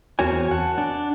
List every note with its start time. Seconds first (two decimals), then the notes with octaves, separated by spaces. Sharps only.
0.19 E2 C4 F#4 A#4 C#5 G#5
0.51 F#5 A5
0.78 D4